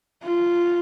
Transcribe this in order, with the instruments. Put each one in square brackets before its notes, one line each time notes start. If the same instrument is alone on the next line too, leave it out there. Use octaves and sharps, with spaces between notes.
[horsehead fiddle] F4